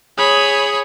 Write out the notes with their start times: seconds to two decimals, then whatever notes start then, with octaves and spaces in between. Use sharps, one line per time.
0.18 G#4 C#5 B5 D#6